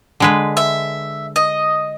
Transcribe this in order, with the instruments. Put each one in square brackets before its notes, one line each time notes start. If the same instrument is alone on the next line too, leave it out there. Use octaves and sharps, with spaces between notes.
[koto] D3 G#3 B4
[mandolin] E5
D#5